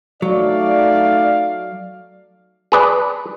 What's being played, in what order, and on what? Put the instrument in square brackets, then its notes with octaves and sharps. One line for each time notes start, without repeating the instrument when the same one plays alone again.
[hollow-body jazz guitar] F#3 [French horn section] A3 D#4 D5 [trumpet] F5
[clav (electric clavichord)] G#4 B4 D5